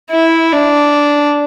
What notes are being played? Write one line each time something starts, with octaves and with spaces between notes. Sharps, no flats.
E4
D4